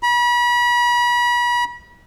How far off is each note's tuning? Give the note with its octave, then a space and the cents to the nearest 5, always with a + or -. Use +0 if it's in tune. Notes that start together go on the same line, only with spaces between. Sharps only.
B5 -35